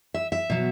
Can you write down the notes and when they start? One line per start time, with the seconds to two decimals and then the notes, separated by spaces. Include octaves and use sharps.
0.14 E5
0.32 E5
0.50 B2 F#3